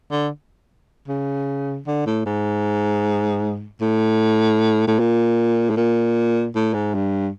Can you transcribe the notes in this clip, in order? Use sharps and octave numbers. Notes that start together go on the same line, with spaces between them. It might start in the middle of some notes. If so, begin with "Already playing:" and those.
D3
C#3
D3
A2
G#2
A2
A2
A#2
A2
A#2
A2
G#2
G2